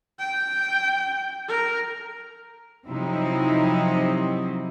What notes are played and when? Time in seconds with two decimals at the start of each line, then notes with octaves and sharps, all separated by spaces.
0.19 G5
1.48 A#4
2.87 C3 F3 F#3 C4 D#4 E4